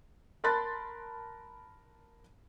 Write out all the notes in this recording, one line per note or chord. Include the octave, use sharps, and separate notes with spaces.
A#4 A5 B5 C6 F#6 A6